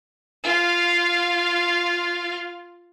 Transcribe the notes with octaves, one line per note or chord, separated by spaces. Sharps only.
F4 F5